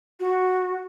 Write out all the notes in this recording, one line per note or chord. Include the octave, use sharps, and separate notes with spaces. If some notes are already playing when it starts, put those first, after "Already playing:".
F#4